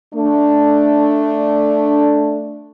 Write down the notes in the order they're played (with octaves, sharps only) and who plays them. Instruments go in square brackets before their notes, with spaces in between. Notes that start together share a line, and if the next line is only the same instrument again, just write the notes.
[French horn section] A3 D4